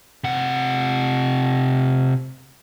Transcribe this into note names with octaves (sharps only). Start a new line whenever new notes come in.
C3 F#5